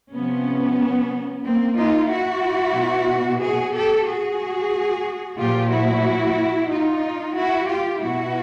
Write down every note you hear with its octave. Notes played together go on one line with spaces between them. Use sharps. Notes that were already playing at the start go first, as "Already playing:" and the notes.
C3 F3 B3 C#4
A#3 C4
D#4 F4
E4 F#4
B2
F#4 G#4
G4 A4
F#4 G#4
A#2 F3 F4 G4
E4 F#4
D#4 F4
E4 F#4
F4 G4
B2 E4 F#4